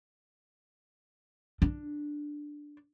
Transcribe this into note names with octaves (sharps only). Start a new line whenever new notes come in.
D4